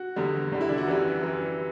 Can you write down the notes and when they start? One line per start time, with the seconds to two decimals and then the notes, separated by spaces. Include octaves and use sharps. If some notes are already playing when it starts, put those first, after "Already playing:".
Already playing: F#4
0.16 E2 D3 G3
0.52 E2 D3 G3
0.61 E4
0.69 D4
0.78 F#4
0.87 F#2 E3 G3
1.21 F#2 E3 G3